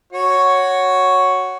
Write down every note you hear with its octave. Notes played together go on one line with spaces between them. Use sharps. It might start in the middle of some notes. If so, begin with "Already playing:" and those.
F#4 C#5